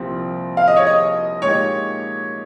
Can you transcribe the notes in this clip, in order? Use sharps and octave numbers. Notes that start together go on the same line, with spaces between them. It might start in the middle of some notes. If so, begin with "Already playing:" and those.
Already playing: C2 A#2 F3 C4
F5
D#5
C#5
D#5
A#2 G#3 D#4 G4 C#5